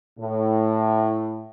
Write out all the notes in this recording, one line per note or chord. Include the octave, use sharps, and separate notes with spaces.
A2